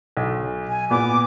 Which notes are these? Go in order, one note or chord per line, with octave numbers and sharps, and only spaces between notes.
B1
G#5
A#2 B3 D6